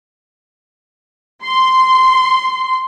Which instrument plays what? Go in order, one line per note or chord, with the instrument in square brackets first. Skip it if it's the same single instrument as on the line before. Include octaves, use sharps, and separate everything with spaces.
[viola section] C6